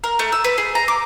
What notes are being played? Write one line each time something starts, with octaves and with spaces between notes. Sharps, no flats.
A#4
A3
E6
B4
G#4
A#5
D6